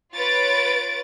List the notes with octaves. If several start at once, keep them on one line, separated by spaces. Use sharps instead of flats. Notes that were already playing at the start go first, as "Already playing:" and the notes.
F4 B4 C#5 A6 D7